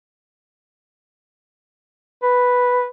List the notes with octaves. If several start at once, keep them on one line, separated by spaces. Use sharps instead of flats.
B4